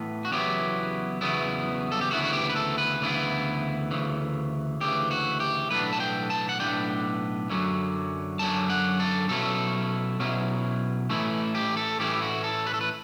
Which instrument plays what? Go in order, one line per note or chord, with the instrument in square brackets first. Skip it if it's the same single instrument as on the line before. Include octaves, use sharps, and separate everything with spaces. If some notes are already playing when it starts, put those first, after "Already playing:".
Already playing: [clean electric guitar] A2 E3 B3
F#4
E2 C#3 F#3 B3 E4 G4
E2 C#3 F#3 B3 E4
A4
G4
D2 C#3 E3 B3 E4 F#4
F#4
G4
B4
A4
B4
D2 C#3 E3 B3 E4
D2 C#3 E3
D2 C#3 E3 G4
F#4
G4
B1 A2 E3 B3 D4 B4
A5
G5
A5
F#5
B1 A2 E3 B3 D4 G5
F#2 D3 F#3 C#4
F#2 D3 F#3 C#4 A5
F#5
A4
B2 F#3 C#4 E4 A4
B2 F#3 C#4 E4
A2 E3 A3 C#4 E4
G4
A4
A2 E3 A3 C#4 E4 G4
F#4
A4
B4
A4
B4